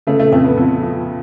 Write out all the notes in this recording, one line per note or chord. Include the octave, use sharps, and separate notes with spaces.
C#3 A3
A3
F2 A3
B3
F2
F3